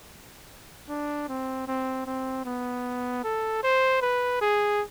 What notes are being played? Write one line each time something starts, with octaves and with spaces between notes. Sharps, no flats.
D4
C4
C4
C4
B3
A4
C5
B4
G#4